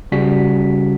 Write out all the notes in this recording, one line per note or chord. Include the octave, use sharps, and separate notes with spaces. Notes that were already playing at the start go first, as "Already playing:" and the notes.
C#3 G3 C#4 F#4 B6